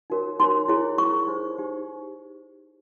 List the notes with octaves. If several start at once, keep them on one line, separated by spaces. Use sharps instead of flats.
D#4 F#4 A#4 C#5
D#4 F#4 A#4 C#5 C6
E4 G#4 C#5
E4 G#4 C#5 C#6
D#4 G4 C5
D#4 G4 C5